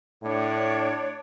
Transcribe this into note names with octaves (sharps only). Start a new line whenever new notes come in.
A2 D4 C#5